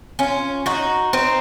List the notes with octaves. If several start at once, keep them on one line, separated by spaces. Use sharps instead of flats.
C#4 F4
D#4 F#4
C4 D#4